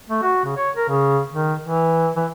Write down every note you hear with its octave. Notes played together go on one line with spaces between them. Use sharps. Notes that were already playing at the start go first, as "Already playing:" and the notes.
A3
F#4
C#3
C#5
A#4
C#3
D#3
E3
E3